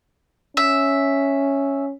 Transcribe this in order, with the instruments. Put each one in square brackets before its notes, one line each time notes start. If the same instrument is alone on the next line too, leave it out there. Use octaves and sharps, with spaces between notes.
[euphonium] C#4 [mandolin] E5